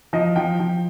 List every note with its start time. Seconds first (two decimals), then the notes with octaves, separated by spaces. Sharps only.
0.13 F3 D#5
0.36 F3 G5
0.59 F3